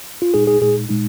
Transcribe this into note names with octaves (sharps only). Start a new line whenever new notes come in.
F4
A#2 G#3 D#4 G#4
G#4
A#2 G#3 D#4 G#4
A#2 G#3 D#4